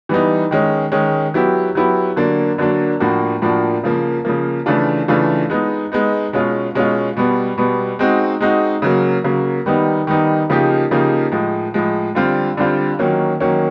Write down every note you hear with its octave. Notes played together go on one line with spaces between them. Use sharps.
E3 G3 B3 D#4
D#3 G#3 C#4
D#3 G#3 C#4
F#3 B3 E4 G4
F#3 B3 E4 G4
D3 F#3 A#3 D4
D3 F#3 A#3 D4
A2 F3 A#3 D4 F#4
A2 F3 A#3 D4 F#4
C#3 F3 A#3
C#3 F3 A#3
C#3 E3 A3 D4 F4
C#3 E3 A3 D4 F4
G#3 B3 D#4
G#3 B3 D#4
B2 G#3 C#4 F4
B2 G#3 C#4 F4
B2 G3 B3
B2 G3 B3
G#3 C4 D#4 F#4
G#3 C4 D#4 F#4
C#3 F#3 A#3
C#3 F#3 A#3
D#3 G3 B3 D#4
D#3 G3 B3 D#4
C#3 F3 A#3 D#4 G4
C#3 F3 A#3 D#4 G4
A2 F3 G#3
A2 F3 G#3
D3 G3 C4 F4
D3 G3 C4 F4
D#3 F#3 A#3 C#4
D#3 F#3 A#3 C#4